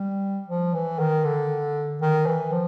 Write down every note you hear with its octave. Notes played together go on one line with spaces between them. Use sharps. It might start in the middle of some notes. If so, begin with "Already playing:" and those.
Already playing: G3
F3
E3
D#3
D3
D#3
E3
F3